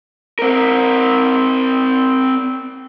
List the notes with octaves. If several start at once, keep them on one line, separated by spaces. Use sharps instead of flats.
C4 A#4